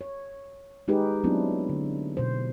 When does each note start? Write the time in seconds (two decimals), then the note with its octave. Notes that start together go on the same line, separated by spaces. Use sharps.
0.01 C#5
0.88 G#3 D#4 G4 G#4 B4
1.24 F#3 A3 B3 C4 D4 E4
1.69 D3
2.17 B2 C5